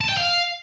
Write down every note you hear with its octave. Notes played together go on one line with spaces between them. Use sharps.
A5
G5
F5